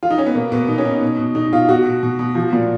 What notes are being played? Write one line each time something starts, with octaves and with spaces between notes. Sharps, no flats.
F4
D#4
C#4
B3
B2 A#3
B2 B3
B2 D#4
C#4
B2 D#4
B2
B2
B2 D#4
B2 F4
B2 F#4
B2
B2
B2
F3
A#2